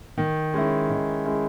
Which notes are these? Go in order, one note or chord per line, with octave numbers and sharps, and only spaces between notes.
D#3
G#3 C#4 E4
D#3
G#3 C#4 E4